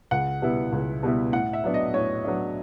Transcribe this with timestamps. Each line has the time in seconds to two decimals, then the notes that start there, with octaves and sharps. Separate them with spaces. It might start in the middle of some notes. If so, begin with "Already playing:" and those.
0.11 C#2 F#5
0.42 B2 G3 B3 E4
0.72 C#2
1.03 B2 G3 B3 E4
1.33 A2 F#5
1.53 E5
1.64 F#3 B3 D4
1.74 D#5
1.94 A2 C#5
2.24 F#3 B3 D4